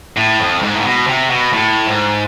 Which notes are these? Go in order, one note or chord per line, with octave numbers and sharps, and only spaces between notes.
A2
F2
G#2
A2
B2
C3
B2
A2
G#2